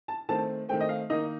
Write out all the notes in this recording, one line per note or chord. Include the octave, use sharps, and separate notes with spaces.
A5
D#3 A3 C4 A5
D#3 A3 C4 G5
D#5
F5
D#3 A#3 D#4 D#5